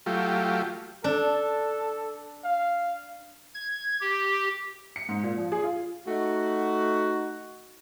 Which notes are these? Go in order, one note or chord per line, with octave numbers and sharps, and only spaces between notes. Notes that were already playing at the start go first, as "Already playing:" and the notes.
F#3 A3 F4 G4
D4 A4
F5
G#6
G4
C#7
G#2
A#2
F3
G#4
F4
A3 D#4 F#4